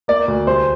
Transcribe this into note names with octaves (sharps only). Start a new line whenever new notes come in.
A#3 D5
D2
C2 C5